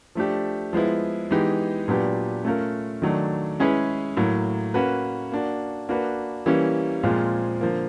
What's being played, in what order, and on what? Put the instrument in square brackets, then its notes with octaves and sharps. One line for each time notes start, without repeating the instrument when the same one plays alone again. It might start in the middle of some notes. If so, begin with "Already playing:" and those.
[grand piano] F3 A3 D4 G4
F3 G#3 B3 E4
E3 G#3 B3 D#4 G4
A#2 F#3 B3 D4 G4
A3 C#4 F4 A#4
D#3 F#3 A3 D4
G#3 C#4 E4 G#4 B4
A2 F#3 A#3
A#3 C#4 F#4 B4
A#3 D4 F#4
A#3 D4 F#4 B4
E3 G3 A#3 C#4
A#2 F3 G#3 C4 F4
D3 F3 A#3